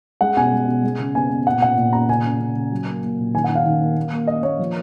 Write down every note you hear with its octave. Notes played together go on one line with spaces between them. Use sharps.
G#3 F#5
B2 G#5
G#3
B2
G#3
C#3
B3 G#5
B3
A#2 F#5
A#2 F#5
A#2
A#2 A#5
C#3 G#5
C#3
C#3
C#3
F#3
A#3
A#3
A#2
D#3 G#5
F#5
D#3
F5
D#3
A#3
A#3
A#3
A#3 D#5
A#3 C#5
F3